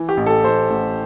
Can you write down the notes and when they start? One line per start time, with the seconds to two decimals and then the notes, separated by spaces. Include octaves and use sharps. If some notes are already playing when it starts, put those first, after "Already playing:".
Already playing: E3
0.09 G4
0.17 A1
0.26 A4
0.44 A1 C5
0.70 A1